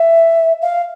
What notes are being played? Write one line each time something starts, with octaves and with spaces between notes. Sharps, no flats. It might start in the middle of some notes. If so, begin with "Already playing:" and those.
Already playing: E5
F5